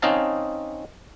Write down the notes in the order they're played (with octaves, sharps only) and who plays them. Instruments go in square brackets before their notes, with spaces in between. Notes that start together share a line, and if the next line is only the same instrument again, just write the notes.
[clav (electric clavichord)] C4 C#4 D#4 D#5 F5 A5